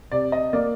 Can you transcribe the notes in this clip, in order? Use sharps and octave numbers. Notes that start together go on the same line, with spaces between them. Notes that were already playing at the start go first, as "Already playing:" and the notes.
C3 D5
D#5
A#3 D5